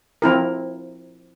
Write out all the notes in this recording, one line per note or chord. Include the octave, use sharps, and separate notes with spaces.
F3 C4 E4 A#4